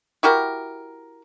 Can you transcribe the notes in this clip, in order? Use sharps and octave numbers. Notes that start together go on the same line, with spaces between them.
E4 F#4 G4 A#4